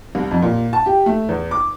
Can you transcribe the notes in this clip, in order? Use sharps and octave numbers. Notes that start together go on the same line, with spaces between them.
C2
F2
A#2
A5
G4
A3
E2
D6